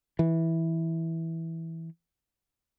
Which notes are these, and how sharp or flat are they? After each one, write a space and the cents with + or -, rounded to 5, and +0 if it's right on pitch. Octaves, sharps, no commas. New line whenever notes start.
E3 -10